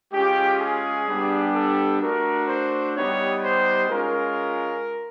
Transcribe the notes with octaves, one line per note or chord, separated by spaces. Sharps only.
G#3 C#4 F4 G4
G#4
G3 B3 D4 G4
A4
A3 D4 F#4 A#4
C5
G3 B3 D#4 G4 C#5
C5
G#3 C#4 F4 A#4